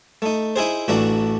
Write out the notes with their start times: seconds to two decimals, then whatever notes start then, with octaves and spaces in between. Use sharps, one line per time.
0.22 A3 D#4
0.56 D#4 E4 G#4 C5
0.88 A1 E3 A3 D4 F#4 A#5